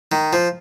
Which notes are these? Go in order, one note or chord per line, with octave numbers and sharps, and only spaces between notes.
D#3
F3